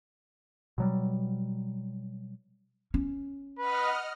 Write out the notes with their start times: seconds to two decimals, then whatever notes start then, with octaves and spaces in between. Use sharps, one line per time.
0.78 B2 F#3 G3
2.94 C#4
3.58 B4 D#5 F#5 F6